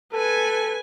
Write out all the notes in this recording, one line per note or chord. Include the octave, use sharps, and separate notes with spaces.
A4 B4 G#5